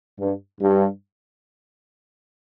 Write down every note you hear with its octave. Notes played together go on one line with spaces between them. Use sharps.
G2
G2